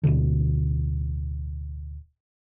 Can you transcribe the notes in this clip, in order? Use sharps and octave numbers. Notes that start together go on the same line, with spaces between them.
D1 B1 B2 D3